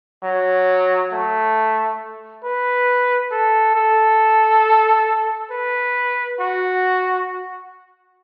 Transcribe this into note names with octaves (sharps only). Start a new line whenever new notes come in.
F#3
A3
B4
A4
A4
B4
F#4